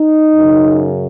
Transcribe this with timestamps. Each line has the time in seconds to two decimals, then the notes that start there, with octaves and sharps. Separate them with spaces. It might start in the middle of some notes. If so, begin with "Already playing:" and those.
Already playing: D#4
0.36 F#2 C#3